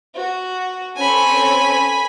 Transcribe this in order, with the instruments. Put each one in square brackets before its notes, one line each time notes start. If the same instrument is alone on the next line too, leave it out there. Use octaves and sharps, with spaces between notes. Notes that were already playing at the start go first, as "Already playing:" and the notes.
[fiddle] F#4
[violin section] C4 C#4 A4 [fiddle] G#5 B5